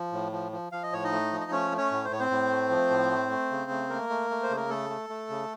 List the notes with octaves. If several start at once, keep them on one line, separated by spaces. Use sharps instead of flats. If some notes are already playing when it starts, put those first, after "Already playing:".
Already playing: F3
A2
F3
F3
F3 F5
D#5
A2 C#5
D#4 D#5
A3
F3
D#5
A3 C#4 C#5
A3
C#4 C#5
A2
C5
A2 C#5
C4 C5
A2
A3
F3
A2
A3
A3
C#3
A3
A3 A#3 A#4
A3
A3
C5
C#3
A#4
A3 A4
A3
A3
C#3